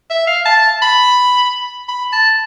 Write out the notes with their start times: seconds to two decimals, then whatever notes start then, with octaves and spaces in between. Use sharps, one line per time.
0.10 E5
0.27 F5
0.46 A5
0.82 B5
1.89 B5
2.13 A5